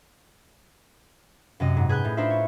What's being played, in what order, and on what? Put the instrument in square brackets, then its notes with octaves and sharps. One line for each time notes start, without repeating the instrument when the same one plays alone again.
[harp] F#2 C3 D#5
G#2
G#4 B4 G#5 F#6 G6
A2
D4 D#4 F4 B4 C5 E5
C#5